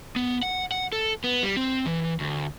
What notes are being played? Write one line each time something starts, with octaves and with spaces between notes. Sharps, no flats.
B3
F#5
F#5
A4
B3
G3
C4
E3
D2